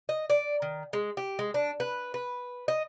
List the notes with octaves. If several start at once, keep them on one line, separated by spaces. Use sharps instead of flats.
D#5
D5
D#3
G#3
G4
G#3
D4
B4
B4
D#5